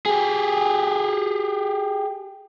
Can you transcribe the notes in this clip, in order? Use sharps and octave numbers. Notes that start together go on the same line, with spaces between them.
G4 G#4